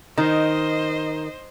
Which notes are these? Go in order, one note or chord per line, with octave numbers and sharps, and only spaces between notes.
D#3 D#4 C5 D#5